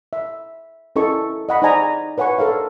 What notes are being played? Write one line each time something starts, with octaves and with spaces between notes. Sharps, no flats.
E5
C#4 E4 A4 A#4 D#5 C#6
D#5 F#5 B5
D#4 C5 D5 D#5 G#5 A#5
B4 C#5 F#5 G#5 C#6
A4 A#4 C#5 F5